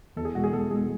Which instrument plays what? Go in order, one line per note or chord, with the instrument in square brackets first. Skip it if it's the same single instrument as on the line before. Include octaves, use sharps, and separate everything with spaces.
[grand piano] E2 [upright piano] A4
[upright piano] G#4
[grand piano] B2 G#3 [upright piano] F#4
[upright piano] G#4
[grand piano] E2 [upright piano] A4
[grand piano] B2 G#3 [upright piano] G#4